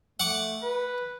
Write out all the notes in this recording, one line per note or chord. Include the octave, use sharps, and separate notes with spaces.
A3 F#5 D6
B4